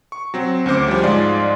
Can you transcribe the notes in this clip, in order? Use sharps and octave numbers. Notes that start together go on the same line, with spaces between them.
C#6
F#3 C4
D2 C#4 C5 D6
F3 G3
G#2 G#3 F4 D5 C6